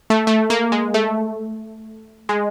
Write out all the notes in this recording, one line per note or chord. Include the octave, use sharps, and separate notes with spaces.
A3
A3
A#3
G#3
A3
G#3